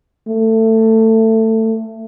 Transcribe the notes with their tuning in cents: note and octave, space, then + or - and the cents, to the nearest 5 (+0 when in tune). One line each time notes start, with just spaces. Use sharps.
A3 +20